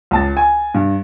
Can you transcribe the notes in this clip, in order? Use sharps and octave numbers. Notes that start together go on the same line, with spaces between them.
C#2 A5 A6
G#5
G2